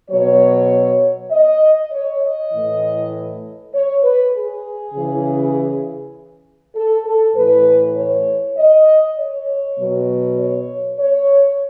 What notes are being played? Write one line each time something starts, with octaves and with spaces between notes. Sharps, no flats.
B2 F#3 C#5
D#5
C#5
D#5
A2 E3
C#5
B4
G#4
C#3 E3
A4
A4
A2 E3 B4
C#5
D#5
C#5
B2 F#3
C#5
C#5